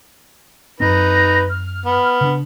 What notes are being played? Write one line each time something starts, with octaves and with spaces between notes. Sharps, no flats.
F#2 C4 D#4 B4 A#6
F6
B3
C#3 D4